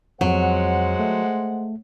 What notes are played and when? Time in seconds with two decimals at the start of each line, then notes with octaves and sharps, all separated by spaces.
0.21 F2 F#3 G#3 C5 F#5
0.99 A3